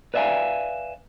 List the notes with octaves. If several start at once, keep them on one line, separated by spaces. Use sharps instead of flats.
B4 D5 E5 F5 G#5